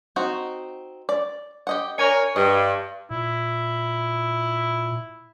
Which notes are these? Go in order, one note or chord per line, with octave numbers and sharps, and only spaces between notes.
C4 D#4 F#4
D5
G4 D#5 F#5
D4 A#4 C#5 G#5
G2 D#5
A#2 E4